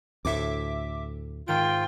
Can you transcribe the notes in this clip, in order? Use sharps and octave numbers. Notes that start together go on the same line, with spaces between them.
D2 A2 E5 D6
G#2 D#3 F4 G5 D7